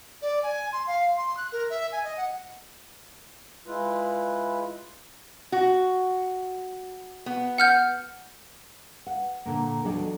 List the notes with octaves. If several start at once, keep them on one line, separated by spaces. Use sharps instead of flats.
D5
G#5
C6
F5
C6
F#6
A#4
E5
G#5
D#5
F#5
G#3 E4 F4 B4
F#4
B3
F#5 F6 G6
F#5
A#2 D3 A#3
E2 F#3 D4 A4 D#5 G5